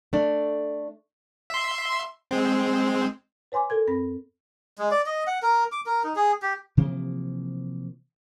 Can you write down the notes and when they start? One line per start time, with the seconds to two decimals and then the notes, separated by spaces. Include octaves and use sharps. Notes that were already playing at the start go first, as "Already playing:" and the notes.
0.13 A3 D4
1.50 E5 C6
2.31 G#3 C4
3.52 B4 C#5 G#5 C6 D6
3.70 A4 A#4 G#6
3.87 F#2 C4 B5 A#6
4.78 G#3
4.91 D5
5.06 D#5
5.27 F#5
5.42 A#4
5.72 D6
5.86 A#4
6.04 D#4
6.16 G#4
6.42 G4
6.77 C3 E3 F3 A#3